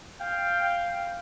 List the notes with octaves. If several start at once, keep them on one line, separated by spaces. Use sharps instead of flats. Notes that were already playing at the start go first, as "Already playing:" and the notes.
F5 G5